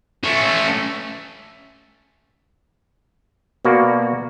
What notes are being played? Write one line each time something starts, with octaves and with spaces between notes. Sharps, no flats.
A3 C#4
B2 A#3 F#4 D5